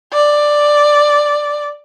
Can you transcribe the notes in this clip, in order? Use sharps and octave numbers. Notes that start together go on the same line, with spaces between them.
D5